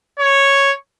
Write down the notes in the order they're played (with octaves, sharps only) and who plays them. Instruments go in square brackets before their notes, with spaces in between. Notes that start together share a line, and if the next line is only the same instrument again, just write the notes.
[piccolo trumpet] C#5